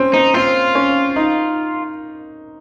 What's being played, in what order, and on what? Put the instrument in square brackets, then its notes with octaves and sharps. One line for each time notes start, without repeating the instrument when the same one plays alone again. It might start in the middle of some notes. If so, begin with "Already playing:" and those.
Already playing: [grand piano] C4 C#4
[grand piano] C4 [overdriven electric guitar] D#4
[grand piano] C4 [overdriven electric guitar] F4
[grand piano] C#4
D#4